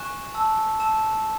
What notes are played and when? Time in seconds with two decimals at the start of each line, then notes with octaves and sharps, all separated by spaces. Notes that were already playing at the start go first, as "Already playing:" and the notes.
Already playing: G#5 C#6 F#6 E7
0.34 A5 E6
0.80 A5 E6 E7